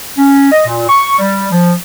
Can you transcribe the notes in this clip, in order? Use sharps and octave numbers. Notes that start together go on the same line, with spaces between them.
C#4
D#5
A#2
C#6
G3
F3